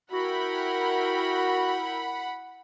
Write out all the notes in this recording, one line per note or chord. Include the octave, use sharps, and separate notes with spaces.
E4 F#4 A#4 F#5 G5 B5